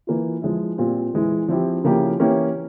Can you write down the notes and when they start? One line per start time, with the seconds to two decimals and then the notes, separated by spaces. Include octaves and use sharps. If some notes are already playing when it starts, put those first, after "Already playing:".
0.07 E3 A#3 F4
0.42 F3 G#3 E4
0.78 A#2 G3 C4 F4
1.14 E3 G#3 E4
1.48 F3 C4 E4 G4
1.84 C#3 F3 A#3 E4 G4
2.19 E3 A#3 C#4 E4 G4